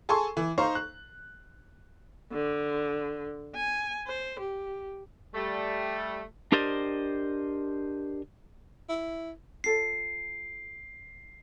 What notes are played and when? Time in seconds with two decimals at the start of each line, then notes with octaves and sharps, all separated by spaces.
0.09 G#4 A4 G#5 A5 C6 C#6
0.37 E3
0.58 D#4 C5 F5 A#5 C#6
0.75 F#6
2.32 D3
3.56 G#5
4.07 C5
4.40 G4
5.35 G3 A3
6.52 D4 G4 A#4 C5 D5 D#5
8.89 E4
9.64 F4 A4 C#5 C7